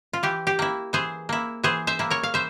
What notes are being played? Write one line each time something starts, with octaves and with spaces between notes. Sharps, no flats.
F4
E3 G4
G4
A#3 E4
E3 G#4 C5
A#3 E4
E3 G#4 C5
C5 E5
A#3 E4
A#4 C#5
F5
E3 C5 E5